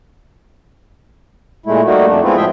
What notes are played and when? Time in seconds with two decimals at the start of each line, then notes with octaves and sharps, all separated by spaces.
1.66 A#2 G#3 A3 E4
1.85 G3 A3 A#3 D#4 F#4
2.07 F2 A3 D4
2.23 F3 G#3 B3 C4 E4 F4
2.37 A2 F3 G#3 G#4 E5 G5